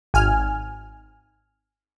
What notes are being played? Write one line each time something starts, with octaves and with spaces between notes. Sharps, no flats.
G#1 G#5 F6